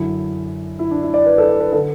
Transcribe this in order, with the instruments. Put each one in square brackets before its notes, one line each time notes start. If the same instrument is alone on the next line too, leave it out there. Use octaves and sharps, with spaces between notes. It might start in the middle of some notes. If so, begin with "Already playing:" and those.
Already playing: [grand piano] F#2 D3 E4
E4
D4
E4
D5
B4
A4
D5
B4
D3 A4